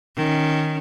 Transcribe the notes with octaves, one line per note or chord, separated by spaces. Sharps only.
D#3 C#4